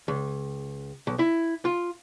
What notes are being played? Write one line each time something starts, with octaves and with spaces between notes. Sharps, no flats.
C#2
B1
E4
F4